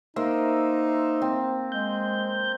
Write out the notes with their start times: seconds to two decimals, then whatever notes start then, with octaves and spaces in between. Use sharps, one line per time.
0.16 A#3 D#4 C5 E5
1.22 C4
1.72 G#3 G6